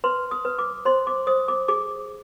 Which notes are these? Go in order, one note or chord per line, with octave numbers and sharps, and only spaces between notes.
B4 C6
D#6
B4
D6
C5 C6
D6
C5 D#6
D6
G#4 D6